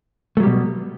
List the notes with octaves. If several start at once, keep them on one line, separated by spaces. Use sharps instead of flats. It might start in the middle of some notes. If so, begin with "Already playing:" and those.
B2 F#3 G3 A3